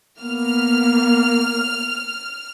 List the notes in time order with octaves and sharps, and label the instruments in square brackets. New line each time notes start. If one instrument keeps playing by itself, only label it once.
[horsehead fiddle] A#3 B3 [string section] F6